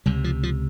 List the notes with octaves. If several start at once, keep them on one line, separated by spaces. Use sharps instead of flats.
C#2 C3 G3
F3
F3